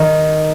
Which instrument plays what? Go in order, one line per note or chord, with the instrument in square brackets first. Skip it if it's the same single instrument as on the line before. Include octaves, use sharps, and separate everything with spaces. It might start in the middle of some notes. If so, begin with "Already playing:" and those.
Already playing: [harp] D#3